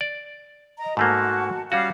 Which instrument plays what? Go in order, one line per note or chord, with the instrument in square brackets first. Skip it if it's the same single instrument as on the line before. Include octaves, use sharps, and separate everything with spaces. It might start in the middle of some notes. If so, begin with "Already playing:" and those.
[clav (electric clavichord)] D5
[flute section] D#5 A#5
[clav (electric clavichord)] G#2 A3 A#3 [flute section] F#4 A5
[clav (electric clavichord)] G3 C#4 F#4 [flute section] F5